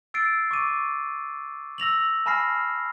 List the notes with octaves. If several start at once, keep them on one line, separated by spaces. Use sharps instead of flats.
E6 A6 C7 D7
C#6 D6 D#7
E6 A#6 F7 F#7
G#5 A5 B5 F6 A#6 C7